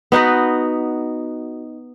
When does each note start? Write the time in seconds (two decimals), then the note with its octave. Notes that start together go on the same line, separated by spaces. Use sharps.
0.12 B3 D#4 F#4 B4